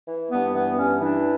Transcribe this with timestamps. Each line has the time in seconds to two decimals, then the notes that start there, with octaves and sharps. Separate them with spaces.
0.08 E3
0.31 G2 B3
0.54 E3 B3
0.77 G2 C#4
1.01 E3 D4